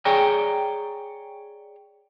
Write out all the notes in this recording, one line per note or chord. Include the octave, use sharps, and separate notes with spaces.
G#4 C#5 D5 G5 A#5